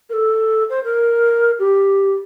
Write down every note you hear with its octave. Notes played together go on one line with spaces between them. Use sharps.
A#4
A4
C5
A#4
G4